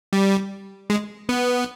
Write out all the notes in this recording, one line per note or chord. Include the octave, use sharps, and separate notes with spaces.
G3
G#3
B3